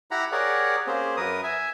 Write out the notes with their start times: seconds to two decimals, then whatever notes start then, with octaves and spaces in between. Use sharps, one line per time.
0.11 E4 G4 F#5 A#5 B5
0.32 G4 G#4 A#4 C#5 D5 F#5
0.87 A#3 C4 C#4 G4 G#4 C5
1.17 F#2 A#4 B4 D#6
1.43 E5 G#5